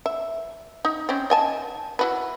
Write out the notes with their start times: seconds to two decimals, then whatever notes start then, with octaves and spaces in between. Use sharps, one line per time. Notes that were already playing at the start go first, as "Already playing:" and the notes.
0.06 E5
0.85 D#4
1.09 C4 C#4
1.30 D#5 G#5 A5
1.99 E4 F#4 B4